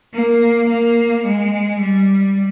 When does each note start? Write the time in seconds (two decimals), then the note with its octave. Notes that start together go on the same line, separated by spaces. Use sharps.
0.14 A#3
0.69 A#3
1.25 G#3
1.81 G3